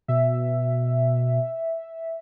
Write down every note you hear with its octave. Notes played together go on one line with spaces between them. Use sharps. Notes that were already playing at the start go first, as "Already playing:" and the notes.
B2 E5